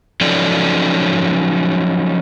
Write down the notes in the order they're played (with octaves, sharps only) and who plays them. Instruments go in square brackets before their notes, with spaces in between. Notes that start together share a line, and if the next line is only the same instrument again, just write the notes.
[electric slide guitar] F3 F#3 C#4 D#4 A4 D5